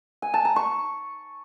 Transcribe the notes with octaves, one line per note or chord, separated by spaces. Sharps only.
G#5
A5
A#5
C#6